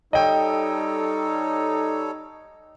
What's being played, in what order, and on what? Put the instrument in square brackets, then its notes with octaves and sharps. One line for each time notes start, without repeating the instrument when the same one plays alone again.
[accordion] G3 A4 C#5 [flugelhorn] D#4 [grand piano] D#5 G5